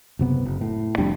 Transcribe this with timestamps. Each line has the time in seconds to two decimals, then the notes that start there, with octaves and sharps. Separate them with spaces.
0.19 F#1 C3 B3
0.45 F#1
0.61 A2
0.98 F1 F2 G3 D4